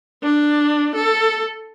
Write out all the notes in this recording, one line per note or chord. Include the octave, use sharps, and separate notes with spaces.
D4
A4